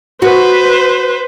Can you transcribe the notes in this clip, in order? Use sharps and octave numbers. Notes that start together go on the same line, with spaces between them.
F#4 B4 C5